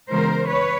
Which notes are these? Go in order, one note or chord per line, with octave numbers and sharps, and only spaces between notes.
C#3 E3 G#3 B3 A#4 C5
B4 C#5